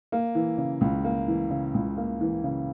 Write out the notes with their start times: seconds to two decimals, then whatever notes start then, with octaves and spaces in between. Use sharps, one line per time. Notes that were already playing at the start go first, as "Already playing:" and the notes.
0.12 A#3
0.35 E3
0.58 C#3
0.81 C#2
1.04 A#3
1.28 E3
1.50 C#3
1.74 C#2
1.97 A#3
2.21 E3
2.44 C#3